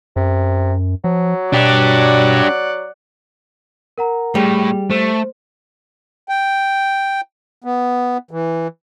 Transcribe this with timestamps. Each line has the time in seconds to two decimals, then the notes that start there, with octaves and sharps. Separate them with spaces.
0.16 F#2 C3
1.04 F3 F#3
1.53 B2 D4 G4 D5 F#5
3.98 A#4 F#5 A#5
4.35 A2 G3 G#4 G5
4.90 A3 C5
6.29 G5
7.64 B3
8.31 E3